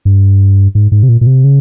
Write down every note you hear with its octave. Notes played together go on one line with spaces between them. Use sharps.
G2
G#2
G#2
C3
A#2
A#2
C3
C#3